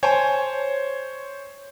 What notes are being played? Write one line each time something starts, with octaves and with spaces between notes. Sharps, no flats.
C5 C#5 G#5 A5